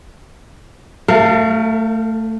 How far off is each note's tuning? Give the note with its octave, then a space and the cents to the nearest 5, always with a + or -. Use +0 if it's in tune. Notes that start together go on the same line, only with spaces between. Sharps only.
A3 +15 A#4 -40 F5 +0